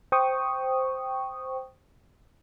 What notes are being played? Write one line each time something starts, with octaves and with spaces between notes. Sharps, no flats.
C5 G5 C#6 D#6